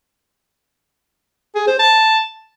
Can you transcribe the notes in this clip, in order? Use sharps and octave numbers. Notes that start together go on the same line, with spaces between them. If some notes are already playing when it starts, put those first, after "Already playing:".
G#4
C5
A5